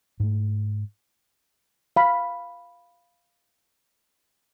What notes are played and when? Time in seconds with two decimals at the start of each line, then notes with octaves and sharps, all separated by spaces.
0.20 G#2 A3
1.96 F5 B5